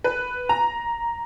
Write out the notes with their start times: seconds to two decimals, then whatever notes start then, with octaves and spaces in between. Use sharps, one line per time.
0.04 B4
0.49 A#5